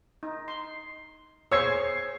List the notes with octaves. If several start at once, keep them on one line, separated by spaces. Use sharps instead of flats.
D#4
C6
G#4 C5 C#5 C#6 E6 G#6 C7